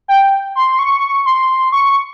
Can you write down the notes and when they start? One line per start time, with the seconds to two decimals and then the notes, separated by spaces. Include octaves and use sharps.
0.08 G5
0.56 C6
0.79 C#6
1.26 C6
1.72 C#6